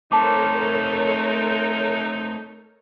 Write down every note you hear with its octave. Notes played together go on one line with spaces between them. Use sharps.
A3 C4 D#4 A4 A#4 C#5 A5 D6